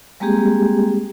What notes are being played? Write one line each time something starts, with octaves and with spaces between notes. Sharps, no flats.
G3 G#3 A#3 C4 G4 G#4